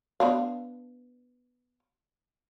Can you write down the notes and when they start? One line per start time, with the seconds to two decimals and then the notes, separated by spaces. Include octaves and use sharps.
0.20 B3 D4 F5